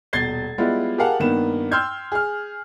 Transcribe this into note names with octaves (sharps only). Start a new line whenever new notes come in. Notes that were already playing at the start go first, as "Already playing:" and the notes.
D#1 B2 G#6 A6 C7 G7
G3 G#3 B3 E4 F4
G4 G#4 A#4 F5 F#5 A5
G2 D#3 A#3 B3 E7
G5 C6 E6 F6 G6 G#6
G#4 F6